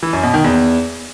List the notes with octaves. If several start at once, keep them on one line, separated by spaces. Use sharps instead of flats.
E3
F#2
B2
D#3
E2